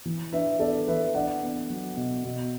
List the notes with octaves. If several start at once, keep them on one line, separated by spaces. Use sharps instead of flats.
E3
D4 B4 E5
B3 A4 D5
E3 B4 E5
D4 D5 F#5
B3
F#3
B2
B2